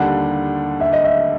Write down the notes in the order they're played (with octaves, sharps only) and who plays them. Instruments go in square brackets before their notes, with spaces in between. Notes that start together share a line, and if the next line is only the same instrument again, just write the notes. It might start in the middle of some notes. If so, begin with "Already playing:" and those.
Already playing: [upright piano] D#2 D3 G3 A#3 D4 [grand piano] F#5
[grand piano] E5
D#5
E5